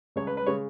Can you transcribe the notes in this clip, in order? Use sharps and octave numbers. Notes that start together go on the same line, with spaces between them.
C#2 C#3 G#3 C#5
B4
B4
C#3 G#3 C#5